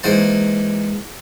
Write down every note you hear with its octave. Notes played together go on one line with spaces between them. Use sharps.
G#2 E3 A#3 C5 A5